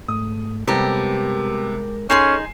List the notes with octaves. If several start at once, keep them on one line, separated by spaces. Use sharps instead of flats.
G#2 A3 D#6
C3 G3 G#3 B3 G4 A4 A#4 A#5
C#4 D#4 G#4 A4 G#5 C6 C7 E7